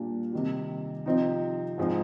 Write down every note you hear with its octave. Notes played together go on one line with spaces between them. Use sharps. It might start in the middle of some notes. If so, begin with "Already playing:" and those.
Already playing: A#2 G3 D4
C3 D#3 G3
C3 F3 C4 D#4
G#2 F3 G#3 C4 D#4